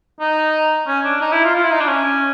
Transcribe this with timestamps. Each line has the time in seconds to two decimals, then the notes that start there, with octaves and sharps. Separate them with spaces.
0.20 D#4
0.87 C#4
1.04 D4
1.21 D#4
1.32 E4
1.44 F4
1.55 F4
1.63 E4
1.71 D#4
1.80 D4
1.89 C#4